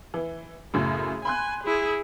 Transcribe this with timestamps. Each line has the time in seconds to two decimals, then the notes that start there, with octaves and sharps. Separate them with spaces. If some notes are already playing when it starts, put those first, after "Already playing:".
0.14 E3
0.74 F#2 A2 C#3 G#4
1.25 G#5 B5 C6 F#6
1.64 E4 G#4